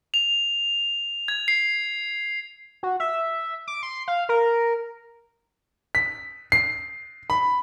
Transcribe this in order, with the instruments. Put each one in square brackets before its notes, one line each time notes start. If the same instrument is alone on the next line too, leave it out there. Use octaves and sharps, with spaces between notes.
[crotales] F7
G#6
C7
[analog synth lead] F#4
E5
D6
C6
F5
A#4
[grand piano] B6
C7
B5